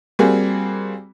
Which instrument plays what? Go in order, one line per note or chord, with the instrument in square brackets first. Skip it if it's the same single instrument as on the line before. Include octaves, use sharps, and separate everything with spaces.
[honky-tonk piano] G3 A#3 C4 F#4 G#4